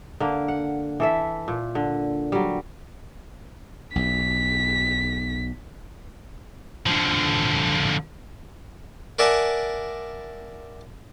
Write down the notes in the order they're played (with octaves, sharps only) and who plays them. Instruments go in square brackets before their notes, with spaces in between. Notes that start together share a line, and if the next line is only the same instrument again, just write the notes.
[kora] D3 A#3
F#5
E3 A4 E5
A#2
D3
F#3 G3
[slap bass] B1 [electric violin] B6
[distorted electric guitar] D3 F3
[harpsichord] A#4 D5 E5 F#5 G#5 A5